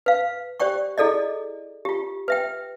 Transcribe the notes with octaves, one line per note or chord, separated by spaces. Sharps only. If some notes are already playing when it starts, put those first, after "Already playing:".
B4 F5
G4 C5 D5 G5 C#6
E4 G#4 A4 D5 D#5
F4 G4
B4 E5 G5